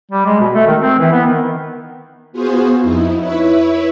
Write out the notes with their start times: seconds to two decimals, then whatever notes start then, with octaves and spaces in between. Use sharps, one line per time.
0.11 G3
0.26 G#3
0.40 B2
0.53 A3
0.67 D#3
0.80 C4
0.99 E3
1.12 B3
1.25 D#3
2.32 B3 F4 F#4 G#4 C5
2.80 F2 D#4 E4
3.20 E4 B4 C#5 E5